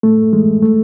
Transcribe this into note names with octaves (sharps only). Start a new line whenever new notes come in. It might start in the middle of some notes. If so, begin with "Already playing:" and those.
A2 A3
E3 G#3
A3